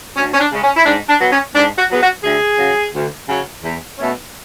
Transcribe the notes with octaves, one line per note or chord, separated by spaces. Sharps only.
D2 C#4
C#4
D4
C#3 G#3 C#4
C#4
E4
G#2 D4
D4
F#3 B3
C#4
G#2 D4
F#4
F#3 B3 G#4
F#4
D2 G#4
C#3 F#3
D2
C#3 F#3
E2
B2 A3 C#4